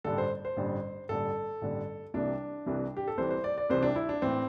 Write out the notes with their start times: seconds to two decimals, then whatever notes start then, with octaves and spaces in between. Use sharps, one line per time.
0.04 A1 G2 D3 A4
0.18 C5
0.45 C5
0.56 A1 G2 D3
1.09 A1 G2 D3 A4
1.61 A1 G2 D3
2.14 C2 C3 E3 D4
2.66 C2 C3 E3
2.97 G4
3.08 A4
3.17 C2 C3 E3 C5
3.31 C5
3.44 D5
3.58 D5
3.70 C2 C3 E3 C5
3.82 D4
3.96 E4
4.09 D4
4.22 A2 E3 C4